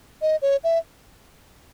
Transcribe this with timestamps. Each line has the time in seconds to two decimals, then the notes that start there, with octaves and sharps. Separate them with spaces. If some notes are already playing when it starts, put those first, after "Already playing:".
0.22 D#5
0.42 C#5
0.64 E5